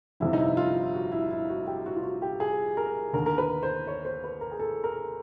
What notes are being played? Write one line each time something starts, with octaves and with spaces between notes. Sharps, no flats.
G1 F2 C3 E4
D#4
E4
F4
F#4
E4
E4
F#4
G4
F#4
F4
F#4
G4
G#4
A#4
D#2 D3 A#4
A#4
B4
C5
C#5
C5
B4
A#4
G#4
A4
A#4